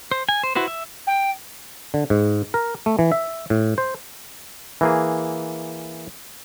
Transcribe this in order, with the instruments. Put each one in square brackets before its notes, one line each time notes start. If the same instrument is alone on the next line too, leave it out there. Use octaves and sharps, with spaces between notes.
[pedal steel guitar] C5
G#5
C5
E4 F#4 B4 C5
E5
[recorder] G5
[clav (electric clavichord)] D3
G#2
A#4
A3
E3
E5
A2
C5
E3 A#3 G#4